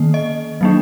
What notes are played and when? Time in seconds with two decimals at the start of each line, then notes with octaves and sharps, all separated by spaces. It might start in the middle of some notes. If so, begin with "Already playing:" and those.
Already playing: D#3 A#3
0.14 D#5
0.61 F#3 A#3 D4